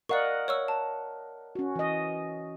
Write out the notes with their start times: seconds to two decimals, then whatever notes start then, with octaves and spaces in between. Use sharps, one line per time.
0.09 A#4 D5 D#5 F5 F#5 C#6
0.48 C#5 C#6 E6
0.68 A5
1.55 C#4 F#4
1.76 E3 D#5